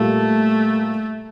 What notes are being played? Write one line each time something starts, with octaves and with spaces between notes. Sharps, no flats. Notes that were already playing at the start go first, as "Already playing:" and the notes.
Already playing: A#2 G3 A3 A#3